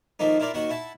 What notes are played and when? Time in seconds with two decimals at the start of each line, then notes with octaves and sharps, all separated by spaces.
0.19 D#3 F3 A3 A#3 D#4
0.40 E4 F4 A#4 D5
0.54 D#2 D#3 F#4 F#5 C#6
0.70 E4 F#5 A5